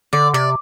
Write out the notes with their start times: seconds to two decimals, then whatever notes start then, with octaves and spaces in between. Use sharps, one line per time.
0.13 D3 D5
0.34 C3 D5